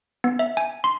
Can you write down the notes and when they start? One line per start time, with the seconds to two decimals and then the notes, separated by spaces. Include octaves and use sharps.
0.24 B3
0.39 E5
0.57 G#5
0.84 C6